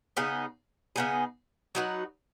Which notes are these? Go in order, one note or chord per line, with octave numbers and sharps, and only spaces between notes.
C#3 B3 D#4 G#4
C#3 B3 D#4 G#4
F#3 D#4 F#4 B4